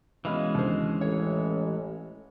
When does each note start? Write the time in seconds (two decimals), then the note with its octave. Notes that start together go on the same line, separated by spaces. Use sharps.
0.25 B2 E3 G#3 C#4 D#5 F5 B5
0.55 D#2 D3 C5
1.01 A1 C#5